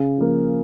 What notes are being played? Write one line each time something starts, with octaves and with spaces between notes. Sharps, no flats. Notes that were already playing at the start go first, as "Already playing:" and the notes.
Already playing: C#3
F3 A#3